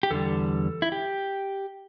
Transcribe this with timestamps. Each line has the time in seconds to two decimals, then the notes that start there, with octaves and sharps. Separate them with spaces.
0.03 G4
0.11 E2 D3 G3 A4
0.82 E4
0.92 G4